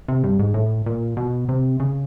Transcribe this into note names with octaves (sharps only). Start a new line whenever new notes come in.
C3
G2
G#2
A2
A#2
B2
C3
C#3